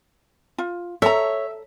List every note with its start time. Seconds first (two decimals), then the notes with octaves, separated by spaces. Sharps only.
0.58 F4
1.02 A4 C#5 E5 A#5